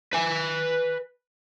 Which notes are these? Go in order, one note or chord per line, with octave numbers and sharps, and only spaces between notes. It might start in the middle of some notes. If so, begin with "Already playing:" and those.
B4 G#5